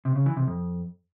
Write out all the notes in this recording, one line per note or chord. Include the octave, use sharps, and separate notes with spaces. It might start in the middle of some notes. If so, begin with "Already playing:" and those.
C3
C#3
E3
C3
F2